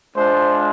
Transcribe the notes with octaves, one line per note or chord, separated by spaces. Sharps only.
G#3 D4 F4 C5